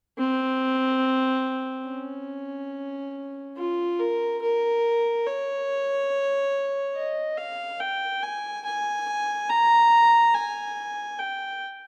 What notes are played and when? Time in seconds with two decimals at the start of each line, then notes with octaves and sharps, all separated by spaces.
0.18 C4
1.87 C#4
3.57 F4
3.99 A#4
4.42 A#4
5.27 C#5
6.96 D#5
7.37 F5
7.80 G5
8.23 G#5
8.65 G#5
9.50 A#5
10.35 G#5
11.19 G5